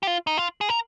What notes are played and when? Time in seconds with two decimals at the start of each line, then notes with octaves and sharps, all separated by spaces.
0.03 G4
0.07 F4
0.27 D#4
0.38 F4
0.61 G#4
0.69 A#4